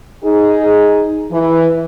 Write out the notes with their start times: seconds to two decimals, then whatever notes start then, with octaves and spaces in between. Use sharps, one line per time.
0.24 D#4 G#4
1.32 E3